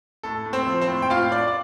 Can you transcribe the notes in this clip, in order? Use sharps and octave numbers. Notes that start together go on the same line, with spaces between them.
A2 A4
A2
C4 C5
F3
C4 C5
A2
G5
A2 F4 F5
D4 D5
D5